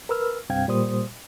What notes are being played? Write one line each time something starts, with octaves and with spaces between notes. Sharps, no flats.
A#4 B4 E6 F6
C2 G2 C4 F5 G5 G#6
A#2 G3 C5 D#6